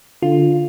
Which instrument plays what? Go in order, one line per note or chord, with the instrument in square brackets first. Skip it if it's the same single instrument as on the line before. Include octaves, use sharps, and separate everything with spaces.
[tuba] D3 [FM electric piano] F4